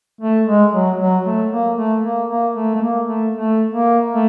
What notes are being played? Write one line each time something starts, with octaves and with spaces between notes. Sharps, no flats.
A3
G#3
F#3
F#3
A3
A#3
A3
A#3
A#3
A3
A3
A#3
A3
A3
A#3
A3